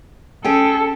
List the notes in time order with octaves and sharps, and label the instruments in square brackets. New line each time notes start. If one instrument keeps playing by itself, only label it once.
[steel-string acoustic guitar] C#4 G#4 G5 [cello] A4